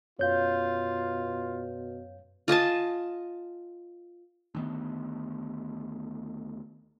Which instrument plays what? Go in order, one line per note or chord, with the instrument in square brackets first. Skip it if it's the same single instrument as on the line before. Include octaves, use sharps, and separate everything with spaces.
[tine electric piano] F#2 G6 [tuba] B2 [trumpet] F4 [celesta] C#5 F5
[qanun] F4 D#5 G#5 A5
[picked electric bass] D2 D#3 B3